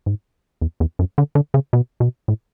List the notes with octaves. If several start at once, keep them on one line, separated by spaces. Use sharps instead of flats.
G#2
E2
E2
F#2
D3
D3
C#3
B2
B2
A2